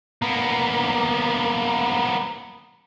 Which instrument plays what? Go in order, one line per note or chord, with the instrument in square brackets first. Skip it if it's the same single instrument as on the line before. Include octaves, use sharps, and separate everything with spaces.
[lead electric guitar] A#3 B3